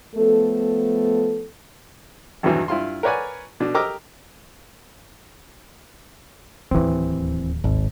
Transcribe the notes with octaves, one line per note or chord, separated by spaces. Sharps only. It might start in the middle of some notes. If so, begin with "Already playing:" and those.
F3 A3 B3 A4
G#1 E2 G2 B2 E3 F#3
G2 E4 F4 C6
A#4 B4 C#5 D5 F#5 G#5
B2 D4 F#4
G4 A#4 D#5 D6 E6 F6
D1 D#2 E3 C4
G#1